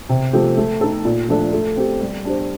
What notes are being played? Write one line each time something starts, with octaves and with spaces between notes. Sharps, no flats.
C3
F3 A3 C4 G4
A3
D#4 A4
A#2
F3 A3 D4 A4
A3
C4 G4
G3
D4 G4 C5